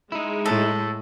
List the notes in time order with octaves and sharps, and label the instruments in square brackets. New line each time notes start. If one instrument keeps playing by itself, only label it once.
[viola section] G#3 [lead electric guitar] D#4 E4
[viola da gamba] A2 [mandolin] A4